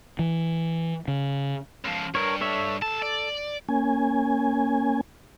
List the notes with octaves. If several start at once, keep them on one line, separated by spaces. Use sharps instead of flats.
E3
C#3
C#2 F3
G2 A#4 C#5
A4 C#5 E5
C#2 A4 A5
D5
A#3 C#4 G#5